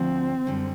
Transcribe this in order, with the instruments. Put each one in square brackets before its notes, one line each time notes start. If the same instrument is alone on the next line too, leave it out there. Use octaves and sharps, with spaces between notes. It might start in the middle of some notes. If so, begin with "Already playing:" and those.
Already playing: [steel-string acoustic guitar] D2 D3 F3 [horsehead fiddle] C4
[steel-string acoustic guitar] F#2 D3 G3